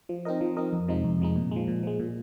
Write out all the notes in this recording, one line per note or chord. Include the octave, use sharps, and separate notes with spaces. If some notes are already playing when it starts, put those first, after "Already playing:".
F3
C4 D#4 A#4 D#5
F3
C4 D#4 A#4 D#5
F2
C3 F3 G#3 D#4
F2
C3 F3 G#3 D#4
A#2
F3 G#3
A#2
F3 G#3
A#2